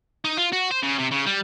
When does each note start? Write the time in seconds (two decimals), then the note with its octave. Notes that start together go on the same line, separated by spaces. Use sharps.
0.25 D#4
0.37 F4
0.52 F#4
0.71 C5
0.83 C#3
0.99 C3
1.12 C#3
1.26 G3